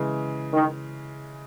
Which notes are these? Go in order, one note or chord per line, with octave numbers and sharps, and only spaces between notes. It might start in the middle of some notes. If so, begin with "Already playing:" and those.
Already playing: C#3 E3 G#3
D#3